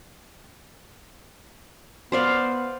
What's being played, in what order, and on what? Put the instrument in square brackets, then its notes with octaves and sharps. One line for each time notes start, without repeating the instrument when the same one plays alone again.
[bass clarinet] B3 [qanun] C5 D5 F5